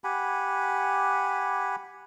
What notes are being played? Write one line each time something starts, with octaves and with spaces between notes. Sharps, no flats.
G4 F#5 G#5 B5